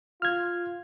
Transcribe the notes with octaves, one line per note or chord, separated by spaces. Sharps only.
F4 F6 G#6